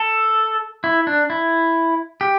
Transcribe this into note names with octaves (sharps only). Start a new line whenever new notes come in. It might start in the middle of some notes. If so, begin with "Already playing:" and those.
Already playing: A4
E4
D4
E4
G4